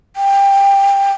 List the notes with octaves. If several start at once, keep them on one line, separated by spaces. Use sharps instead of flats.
G5